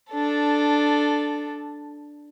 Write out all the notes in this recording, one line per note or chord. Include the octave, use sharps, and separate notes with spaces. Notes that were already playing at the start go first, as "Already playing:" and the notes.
D4 A4